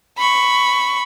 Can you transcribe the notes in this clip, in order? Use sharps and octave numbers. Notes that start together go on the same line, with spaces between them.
B5 C#6